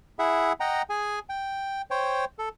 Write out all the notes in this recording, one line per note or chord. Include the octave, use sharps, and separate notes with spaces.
E4 G#4 E5 F#5
D#5 F#5 G5 A#5
G#4 G#5
G5
C5 C#5 G5
A4